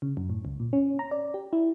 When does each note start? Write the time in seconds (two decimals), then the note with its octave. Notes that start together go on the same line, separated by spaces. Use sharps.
0.02 C#3
0.17 F#2
0.30 A2
0.45 C#2
0.60 A#2
0.73 C#4
0.99 A#5
1.11 D5
1.34 G4
1.53 E4